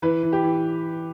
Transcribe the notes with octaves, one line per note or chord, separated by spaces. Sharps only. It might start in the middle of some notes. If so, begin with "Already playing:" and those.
E3 B4
E3
G4
E3